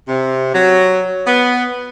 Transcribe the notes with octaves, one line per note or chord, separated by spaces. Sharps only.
C3
F#3
B3